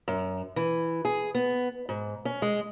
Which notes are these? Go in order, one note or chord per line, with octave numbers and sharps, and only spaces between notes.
F#2
E3
G#4
B3
G#2
C#4
G#3